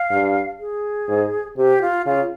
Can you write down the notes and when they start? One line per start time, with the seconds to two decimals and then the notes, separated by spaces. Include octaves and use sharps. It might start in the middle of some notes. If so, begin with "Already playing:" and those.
Already playing: F5
0.11 G2
0.60 G#4
1.09 G#2
1.57 C3 G4
1.82 F4
2.06 C#3 F4